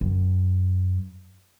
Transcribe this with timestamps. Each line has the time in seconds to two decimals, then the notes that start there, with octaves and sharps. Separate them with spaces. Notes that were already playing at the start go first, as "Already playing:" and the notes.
0.01 F#2